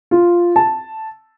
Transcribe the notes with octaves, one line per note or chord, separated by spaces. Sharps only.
F4
A5